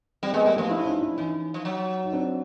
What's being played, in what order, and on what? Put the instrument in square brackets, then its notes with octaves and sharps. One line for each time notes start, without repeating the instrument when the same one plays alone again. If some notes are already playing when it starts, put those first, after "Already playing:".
[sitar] G3 [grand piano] C4
[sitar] G#3 [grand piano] B3
[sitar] G3 [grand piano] A#3
[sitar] F3 [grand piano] A3 B3
[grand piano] D4 E4
C#4 D#4
D4 E4
[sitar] E3 [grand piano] C#4 D#4
[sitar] F3
F#3
[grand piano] D#4
C4 D4